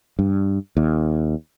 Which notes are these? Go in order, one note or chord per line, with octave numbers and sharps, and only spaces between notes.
G2
D#2